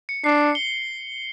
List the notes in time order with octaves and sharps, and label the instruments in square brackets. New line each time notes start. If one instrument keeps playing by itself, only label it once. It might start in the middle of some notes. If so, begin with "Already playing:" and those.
[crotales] C#7
[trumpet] D4 [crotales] C7
[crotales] G7